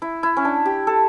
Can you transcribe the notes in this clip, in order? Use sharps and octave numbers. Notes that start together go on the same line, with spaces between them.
E4
E4
C#4
D4
G4
A4